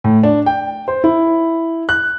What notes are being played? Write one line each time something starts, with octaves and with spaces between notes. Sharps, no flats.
A2
D4
G5
C5
E4
F#6